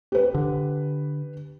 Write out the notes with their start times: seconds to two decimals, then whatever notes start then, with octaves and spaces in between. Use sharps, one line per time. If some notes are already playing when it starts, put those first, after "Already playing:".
0.12 G4 B4
0.35 D3